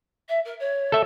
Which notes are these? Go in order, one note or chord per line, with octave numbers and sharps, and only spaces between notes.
E5
A#4
C#5
A4 E5